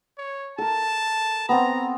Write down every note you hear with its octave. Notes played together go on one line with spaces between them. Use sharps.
C#5
A4 A#4 A5
B3 C4 A#5